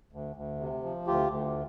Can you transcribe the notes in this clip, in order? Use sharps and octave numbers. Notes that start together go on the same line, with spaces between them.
D2
D2
C3
F3
D2 F4 G4
D2